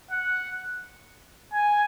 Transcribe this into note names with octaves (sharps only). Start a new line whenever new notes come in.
F#5
G#5